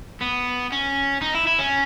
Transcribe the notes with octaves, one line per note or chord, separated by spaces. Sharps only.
B3
C#4
D#4
E4
E4
C#4